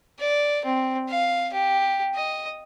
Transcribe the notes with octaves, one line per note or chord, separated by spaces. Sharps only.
D5
C4
F5
G4
D#5